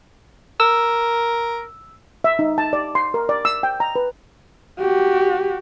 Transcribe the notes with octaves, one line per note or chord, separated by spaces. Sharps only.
A#4 E6
E5
D#4
A5
D5
C6
A#4
D5
E6
G5
A#5
B4
F#4 G4